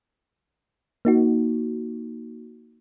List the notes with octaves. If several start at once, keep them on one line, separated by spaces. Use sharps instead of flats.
A#3 D#4 F#4